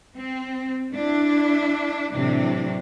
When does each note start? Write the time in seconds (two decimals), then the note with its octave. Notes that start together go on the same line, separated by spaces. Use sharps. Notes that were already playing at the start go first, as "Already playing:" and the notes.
0.17 C4
0.92 D4 E4
2.13 A2 C3 E3 F#3 D4